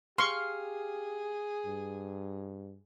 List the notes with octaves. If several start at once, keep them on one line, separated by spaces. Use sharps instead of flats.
G4 G#4 F5 C6 C#6
G2